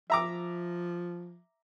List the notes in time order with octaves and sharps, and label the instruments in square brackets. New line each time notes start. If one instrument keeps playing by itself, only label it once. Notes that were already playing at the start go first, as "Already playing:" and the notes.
[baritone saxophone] F3 [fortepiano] E5 A#5 D6